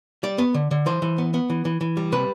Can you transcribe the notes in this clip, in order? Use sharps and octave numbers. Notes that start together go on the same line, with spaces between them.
G3 D5
B3
D3
D3
E3 C5
E3
B3
B3
E3
E3
E3
G3
C3 B4